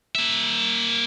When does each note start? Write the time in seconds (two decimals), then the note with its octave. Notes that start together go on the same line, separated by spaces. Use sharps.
0.15 A#3 E5